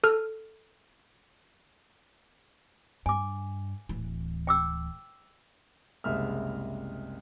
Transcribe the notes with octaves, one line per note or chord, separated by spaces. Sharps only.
A4 F6
G2 G#5 D6
D1 E3
G5 D6 E6
F#1 C2 G#3 E5 F6